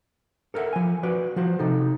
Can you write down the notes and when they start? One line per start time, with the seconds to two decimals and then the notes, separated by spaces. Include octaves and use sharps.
0.54 A4 A#4 C#5 E5 F#5
0.73 F3 G#5
1.03 F#4 B4 D5
1.36 F3 F#4 C5
1.59 C3 D#4 A4